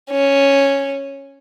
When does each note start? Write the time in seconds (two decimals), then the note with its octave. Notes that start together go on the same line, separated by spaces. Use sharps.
0.11 C#4